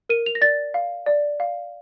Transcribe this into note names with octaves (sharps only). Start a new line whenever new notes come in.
A#4 D#7
F7
A#6
D5 A6
F5
D5
F5